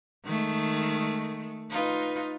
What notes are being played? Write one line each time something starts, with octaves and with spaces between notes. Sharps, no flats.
D#3 G#3 A3
D#4 F4 B4